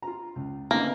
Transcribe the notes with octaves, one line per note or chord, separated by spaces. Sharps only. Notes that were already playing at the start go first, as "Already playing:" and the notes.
F4 A#5
C#2
A1 D3 A#3 B3 D#4